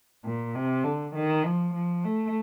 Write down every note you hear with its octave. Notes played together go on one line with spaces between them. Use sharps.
A#2
C3
D3
D#3
F3
F3
A3